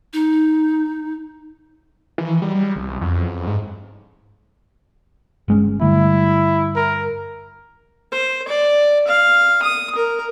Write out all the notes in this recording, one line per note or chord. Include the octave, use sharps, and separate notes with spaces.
D#4
E3
G3
G3
C2
F2
G#2
G1 G#3 C#4
G2 D3 A3 E4
A#4
C5
D5
F5
D#6
A#4